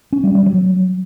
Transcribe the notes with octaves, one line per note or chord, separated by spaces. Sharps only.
C#4
G3
G3
F#3